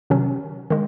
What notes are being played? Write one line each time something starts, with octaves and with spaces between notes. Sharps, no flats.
C3 D#3 F#3 C#4
D#3 G#3